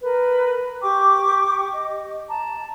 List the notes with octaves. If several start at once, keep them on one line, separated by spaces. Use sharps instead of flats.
A#4 B4
G4 G5 C#6 D6
D#5
A5 A#5